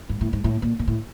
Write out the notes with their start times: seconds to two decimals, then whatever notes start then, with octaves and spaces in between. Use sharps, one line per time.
0.09 G#2
0.21 A2
0.33 G#2
0.44 A2
0.62 A#2
0.79 A#2
0.87 A2